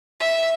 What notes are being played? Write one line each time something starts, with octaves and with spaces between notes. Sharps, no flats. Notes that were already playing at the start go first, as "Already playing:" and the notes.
E5